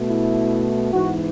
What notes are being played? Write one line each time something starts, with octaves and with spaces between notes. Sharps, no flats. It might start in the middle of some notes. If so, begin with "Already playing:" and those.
Already playing: B2 A3
E4
G#2 E3 B3 F#4